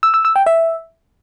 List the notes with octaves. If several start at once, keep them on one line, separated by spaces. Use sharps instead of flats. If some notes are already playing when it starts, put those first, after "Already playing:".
E6
E6
E6
G5
E5